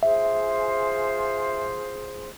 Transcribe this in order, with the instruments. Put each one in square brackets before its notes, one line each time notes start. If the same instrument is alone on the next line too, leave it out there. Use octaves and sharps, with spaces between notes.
[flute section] F4 G#4 C5 [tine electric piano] E5